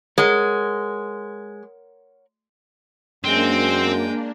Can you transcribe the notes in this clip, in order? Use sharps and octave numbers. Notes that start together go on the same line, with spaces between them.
G#3 A#4 C#5 F#5
F#2 G#3 A#3 C4 D4 G5